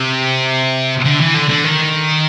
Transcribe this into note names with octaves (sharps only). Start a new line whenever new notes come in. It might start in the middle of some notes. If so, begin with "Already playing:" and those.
Already playing: C3
D3
E3
D3
D3
D#3